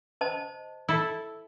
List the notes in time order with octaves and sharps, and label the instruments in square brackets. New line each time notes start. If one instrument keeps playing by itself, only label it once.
[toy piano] C5 D#5 A5
[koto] E4 A4